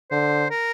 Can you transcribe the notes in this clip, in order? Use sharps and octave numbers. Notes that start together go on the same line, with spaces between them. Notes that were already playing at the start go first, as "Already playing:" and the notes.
D3 C5
A#4